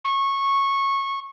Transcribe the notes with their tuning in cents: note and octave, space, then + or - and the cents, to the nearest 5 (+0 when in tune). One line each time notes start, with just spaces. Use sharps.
C#6 -15